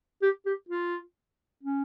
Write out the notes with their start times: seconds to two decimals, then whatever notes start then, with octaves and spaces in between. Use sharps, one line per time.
0.22 G4
0.46 G4
0.69 F4
1.63 C#4